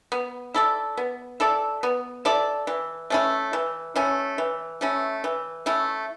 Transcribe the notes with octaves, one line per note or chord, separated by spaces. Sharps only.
B3
E4 A4 D5
B3
E4 A4 D5
B3
E4 A4 D5
E3
A3 C#4 E4
E3
A3 C#4 E4
E3
A3 C#4 E4
E3
A3 C#4 E4